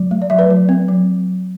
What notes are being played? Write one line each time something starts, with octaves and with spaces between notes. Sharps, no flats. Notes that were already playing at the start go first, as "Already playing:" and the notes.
Already playing: F#3
A3
D5
F#3 E5
B4 D5
F#3
C4
F#3